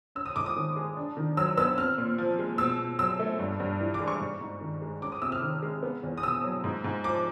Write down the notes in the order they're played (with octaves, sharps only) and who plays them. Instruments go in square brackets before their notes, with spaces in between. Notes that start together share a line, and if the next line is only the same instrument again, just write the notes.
[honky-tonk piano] C#4 E6
D#6
G#2 D6
D#6
D#3
G#3
D4
D#3
F#3 E6
B3 E6
C4 F6
A#2
F3
G#3
B2 E6
B2
F#3 E6
A3
G2
G2
E3
D6
G#3
C#6
G#2
G#2
D#3
G#3
C#4 D6
D#6
C3 E6
F6
D#3
G#3
B3
E2
D#6
B2 E6
F#3
G#2
G#2
F3 D6